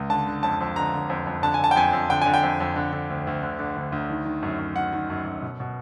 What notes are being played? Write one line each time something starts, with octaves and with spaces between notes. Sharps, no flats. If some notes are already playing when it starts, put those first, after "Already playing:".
Already playing: C#2
D3 A5
D3
F2 A5
F2
D3 A#5
D3
F2
F2
D3 A5
G#5
D3 A5
G5
F2 G#5
F2
D3 G5
D3 G#5
G5
F2
F2
D3
D3
D2
D2
D3
D3
D2
D2
D#3
D#3
F#2
F#2
D#3 F#5
D#3
F#2
F#2
B2
B2